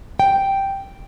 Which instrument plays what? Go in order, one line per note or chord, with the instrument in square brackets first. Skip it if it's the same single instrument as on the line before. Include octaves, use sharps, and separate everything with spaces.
[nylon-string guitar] G5